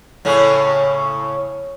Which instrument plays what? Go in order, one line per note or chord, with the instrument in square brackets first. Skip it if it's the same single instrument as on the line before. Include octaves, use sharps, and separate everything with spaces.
[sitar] A2 C#3 C#4